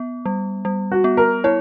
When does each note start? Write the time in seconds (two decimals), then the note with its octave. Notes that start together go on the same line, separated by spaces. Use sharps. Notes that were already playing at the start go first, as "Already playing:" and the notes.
Already playing: B3
0.26 G3
0.65 G3
0.92 F#4
1.04 B3
1.17 A#4
1.44 E4 C#5